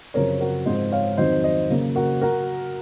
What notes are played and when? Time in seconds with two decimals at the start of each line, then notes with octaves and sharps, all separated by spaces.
0.14 F#2 C#3 F3 C4 A#4 C#5
0.40 F#4 A#4
0.66 G#2 F3 C4 C5 D#5
0.92 C#5 F5
1.17 F2 D#3 F#3 C4 C5 D#5
1.43 C5 D#5
1.70 C#3 F#3 A#3
1.96 F#4 A#4
2.22 F#4 A#4